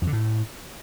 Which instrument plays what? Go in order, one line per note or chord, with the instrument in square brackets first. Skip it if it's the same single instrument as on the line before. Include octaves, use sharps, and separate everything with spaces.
[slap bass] F2
D3
A2